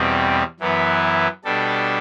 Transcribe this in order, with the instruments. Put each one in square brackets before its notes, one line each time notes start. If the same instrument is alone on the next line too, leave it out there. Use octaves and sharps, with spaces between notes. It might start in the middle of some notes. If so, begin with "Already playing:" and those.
Already playing: [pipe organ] E2 B2 G3 C4
F#2 E3 B3 E4
B2 G3 D4 A4